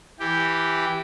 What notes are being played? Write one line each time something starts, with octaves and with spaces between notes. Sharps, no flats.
E3 G4